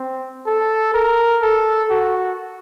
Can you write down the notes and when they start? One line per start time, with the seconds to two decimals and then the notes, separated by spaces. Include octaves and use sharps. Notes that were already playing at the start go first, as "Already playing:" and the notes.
Already playing: C4
0.46 A4
0.94 A#4
1.42 A4
1.90 F#4